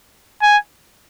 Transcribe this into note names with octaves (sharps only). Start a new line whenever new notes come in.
G#5